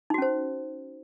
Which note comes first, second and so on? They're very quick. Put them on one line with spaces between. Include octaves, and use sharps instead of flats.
D#4 F#4 C#4 C5